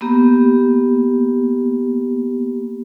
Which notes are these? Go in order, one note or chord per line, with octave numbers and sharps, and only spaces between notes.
A#3 B3 G4